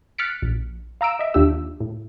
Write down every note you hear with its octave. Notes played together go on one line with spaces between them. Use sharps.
F6 F#6 A6 B6 C#7 D7
A#1
F5 A#5 E6 D7 E7
D#5 E5
D#2 D4 F4 G4 E6
A2